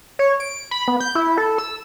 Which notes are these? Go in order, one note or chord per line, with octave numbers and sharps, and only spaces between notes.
C#5
D7
B5
B3
G6
E4
A4
E6